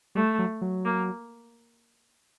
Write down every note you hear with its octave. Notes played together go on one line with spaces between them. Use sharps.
G3 A3
F#3
F#3
A#3